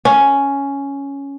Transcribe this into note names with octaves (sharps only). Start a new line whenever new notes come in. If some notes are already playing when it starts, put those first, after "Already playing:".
C#4